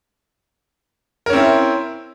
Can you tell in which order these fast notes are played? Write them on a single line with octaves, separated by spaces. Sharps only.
A#4 C#4 C4 E4